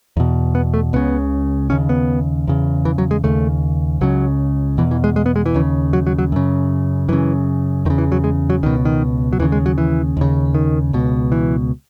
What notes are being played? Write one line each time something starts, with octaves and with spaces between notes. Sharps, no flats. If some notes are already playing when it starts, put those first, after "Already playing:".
E2 B2
B3
A3
C#2 C#3 B3
D#2 C#3 C#4
B3
E2 C#3
E3
F#3
G#3
D#2 C#3 A3
C#2 C#3 F#3
E2 B2 E3
E3
G#3
G#3
B3
G#3
E3
D#2 C#3
F#3
F#3
F#3
F#2 C#3
F#2 C#3 E3
E2 C#3 D#3
E3
F#3
G#3
F#3
C#2 B2 D#3
D#3
F#3
D#2 C#3 E3
G#3
F#3
E3
D#2 C#3
D#3
C#2 B2
E3